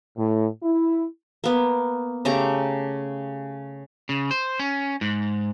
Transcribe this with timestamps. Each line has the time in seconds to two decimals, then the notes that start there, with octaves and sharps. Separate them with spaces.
0.17 A2
0.63 E4
1.44 A#3 B3
2.25 C#3 A3 G4 A#5
4.09 C#3
4.31 C5
4.59 C#4
5.01 G#2